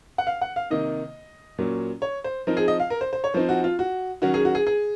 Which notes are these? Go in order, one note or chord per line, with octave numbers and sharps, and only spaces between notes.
F#5
F5
F#5
F5
C3 D#3 A#3 D#4 D#5
A#2 F#3 C#4
C#5
C5
F3 C4 D#4 A#4
G#4
D#5
F5
A#4
C5
C5
C#5
F3 C4 D#4 C5
F#4
F4
F#4
D#3 F#3 C#4 F#4
G#4
F#4
G#4
G#4